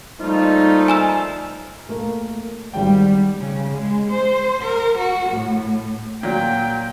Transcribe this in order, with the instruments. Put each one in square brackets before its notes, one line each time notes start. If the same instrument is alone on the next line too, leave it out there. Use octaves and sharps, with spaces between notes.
[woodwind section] F3 G3 F4 [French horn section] A3 A#3 D#4
[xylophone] G#5 A#5 E6
[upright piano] A3 A#3 A#4
[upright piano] G#1 F#4 G5 [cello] G3
[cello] C#3
G#3
C5
A#4
F#4
A2
[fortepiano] A#2 F#3 [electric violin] G5